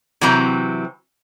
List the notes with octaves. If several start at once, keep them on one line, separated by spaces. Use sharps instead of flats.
C3 E3 F#3 C4 A#5